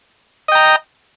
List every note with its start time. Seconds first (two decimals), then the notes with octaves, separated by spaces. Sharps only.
0.48 D#5
0.52 G5
0.55 A#5